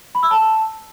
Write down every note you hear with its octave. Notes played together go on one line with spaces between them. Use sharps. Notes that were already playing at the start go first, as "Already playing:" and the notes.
B5
E6
A5